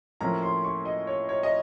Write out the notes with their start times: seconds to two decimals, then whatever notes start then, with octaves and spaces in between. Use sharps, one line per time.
0.21 A2 F3 A#3 C#4 A#5
0.43 C6
0.64 C#6
0.85 D#5
1.07 C#5
1.29 C#5
1.43 D#5